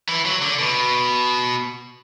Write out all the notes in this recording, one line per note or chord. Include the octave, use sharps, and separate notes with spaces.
E3
F#3
D3
B2